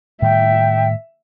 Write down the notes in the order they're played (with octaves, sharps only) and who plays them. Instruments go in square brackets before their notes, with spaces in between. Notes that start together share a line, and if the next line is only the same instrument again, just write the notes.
[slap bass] A2 D#3 G3 [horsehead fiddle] E5 [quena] G5